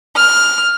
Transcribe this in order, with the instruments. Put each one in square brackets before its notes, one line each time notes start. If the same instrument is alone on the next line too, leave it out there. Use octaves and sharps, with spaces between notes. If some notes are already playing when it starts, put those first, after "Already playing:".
[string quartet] F6